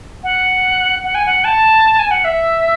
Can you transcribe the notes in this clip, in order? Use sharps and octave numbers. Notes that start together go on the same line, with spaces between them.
F#5
F#5
G#5
F#5
A5
G#5
F#5
E5